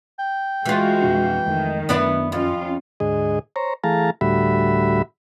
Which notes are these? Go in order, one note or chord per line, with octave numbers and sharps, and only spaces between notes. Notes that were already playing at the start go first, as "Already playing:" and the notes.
G5
E3 G#3 F4 F#4 F5
F2 B2 D4
F2 D#3 G#3 A3
F#2 B3 D4 E4
F2 C#4 F4
D2 G#2 G#4 D#5
C5 C#5 A#5
E3 A3 G#4 F5 A5 A#5
D2 A2 G3 F#4 E5 B5